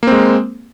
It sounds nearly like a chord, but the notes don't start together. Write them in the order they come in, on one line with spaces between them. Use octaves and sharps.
A#3 C4 G#3